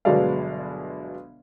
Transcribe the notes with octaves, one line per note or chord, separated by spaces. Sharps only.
G1 B2 F#3 G#3 D5 F5